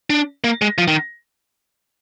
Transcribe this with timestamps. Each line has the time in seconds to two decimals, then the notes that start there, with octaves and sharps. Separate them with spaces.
0.10 D4
0.44 A#3
0.62 G#3
0.78 F3
0.88 D#3